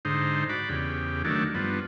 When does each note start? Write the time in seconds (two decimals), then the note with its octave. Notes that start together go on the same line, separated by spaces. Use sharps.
0.05 G#2 D3 D#4 C5
0.49 F#4 D5 B5
0.69 E2 C#3 G4
1.25 D#3 F#3 A3 D4
1.54 G2 F3 B3